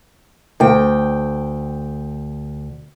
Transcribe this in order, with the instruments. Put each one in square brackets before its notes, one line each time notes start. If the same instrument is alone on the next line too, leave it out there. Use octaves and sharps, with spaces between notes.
[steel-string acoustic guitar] D2 G5